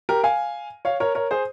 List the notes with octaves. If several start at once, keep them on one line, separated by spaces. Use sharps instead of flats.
G4 A#4
F5 G#5
C#5 F5
A#4 C#5
A#4 C#5
G#4 C5